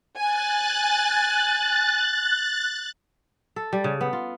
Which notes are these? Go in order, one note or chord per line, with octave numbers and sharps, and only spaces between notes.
G#5 F#6 A6
A4
G3
C#3
B3
F4